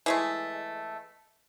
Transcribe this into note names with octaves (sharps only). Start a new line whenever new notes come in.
E3 G#3 A3